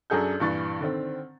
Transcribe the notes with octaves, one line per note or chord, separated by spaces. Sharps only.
F#2 F#3 D4 G#4 A4 G6
G2 A#2 E3 C#6 A6
D3 D#3 C4